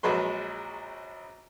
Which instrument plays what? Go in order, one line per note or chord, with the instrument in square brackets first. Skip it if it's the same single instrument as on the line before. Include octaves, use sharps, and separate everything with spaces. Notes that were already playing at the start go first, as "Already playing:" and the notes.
[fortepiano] A#1 F#3 G#3 B4 C6